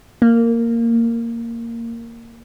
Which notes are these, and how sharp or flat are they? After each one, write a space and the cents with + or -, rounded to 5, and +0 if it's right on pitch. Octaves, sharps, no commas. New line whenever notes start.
A#3 -10